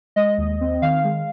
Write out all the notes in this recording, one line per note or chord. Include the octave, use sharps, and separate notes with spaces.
G#3 D#5
D#2
C4
D#3 F5
G#3